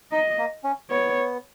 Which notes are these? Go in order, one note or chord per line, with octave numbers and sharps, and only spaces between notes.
D#4 D#5
A#3
C#4
B3 C#5